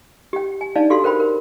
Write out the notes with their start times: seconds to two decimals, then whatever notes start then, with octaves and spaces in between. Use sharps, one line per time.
0.33 G4 G5
0.61 G#5
0.75 D4 D#4 D5 F5 A5
0.90 F#4 G4 A4 F5 C6
1.04 A#4 C5 G5 B5
1.20 A#4